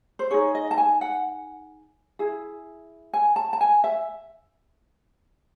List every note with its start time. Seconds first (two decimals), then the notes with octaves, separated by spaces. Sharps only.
0.19 C5
0.31 D#4 G#4 C#5
0.55 D#5
0.71 A5
0.78 G#5
1.01 F#5
2.19 E4 G#4
3.13 G#5
3.36 A5
3.53 A5
3.61 G#5
3.84 E5